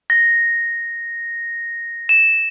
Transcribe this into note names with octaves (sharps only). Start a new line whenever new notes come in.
A#6
E7